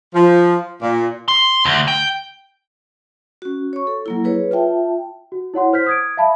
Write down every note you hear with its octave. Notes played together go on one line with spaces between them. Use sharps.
F3
A#2
C6
D2
G5
C#4 F#4
C#5 C#6
A4
F#3 A#3 E4
G#4 B4 C#5
F4 E5 G5 A5
F#4
E4 C#5 F#5 C6
C5 F6 G6 B6
D#6 G#6 D7
E5 F5 A5 B5